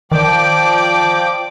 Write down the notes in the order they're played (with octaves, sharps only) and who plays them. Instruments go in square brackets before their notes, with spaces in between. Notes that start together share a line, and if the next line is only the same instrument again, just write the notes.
[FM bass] D#3 [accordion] F3 G5 D6 [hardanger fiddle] D5